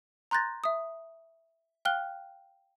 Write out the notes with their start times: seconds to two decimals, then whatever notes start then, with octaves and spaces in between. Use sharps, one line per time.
0.31 A#5 C6 F#6 G6 A6 A#6
0.64 E5 D#6
1.85 F5 G5 F6 F#6 G7